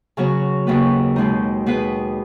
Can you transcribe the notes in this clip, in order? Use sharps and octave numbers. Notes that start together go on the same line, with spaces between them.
C#3 F#3 B3 F#4 C#5
D#2 C#3 B3 F#4 B4
B2 G#3 D#4
B2 B3 G#4 B4